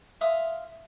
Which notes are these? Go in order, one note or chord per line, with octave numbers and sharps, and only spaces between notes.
E5 F5 C6 D#6